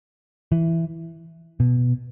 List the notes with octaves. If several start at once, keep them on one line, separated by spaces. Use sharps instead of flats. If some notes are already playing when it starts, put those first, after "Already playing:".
E3
B2